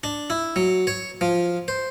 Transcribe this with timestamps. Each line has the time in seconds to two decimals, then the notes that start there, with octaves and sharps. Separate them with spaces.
0.04 D4
0.30 E4
0.56 F#3
0.87 C#5
1.21 F3
1.68 C5